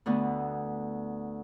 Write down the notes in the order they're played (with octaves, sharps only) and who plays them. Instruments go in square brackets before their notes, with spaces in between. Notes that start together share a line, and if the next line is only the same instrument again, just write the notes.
[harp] D2 D3 A3 B3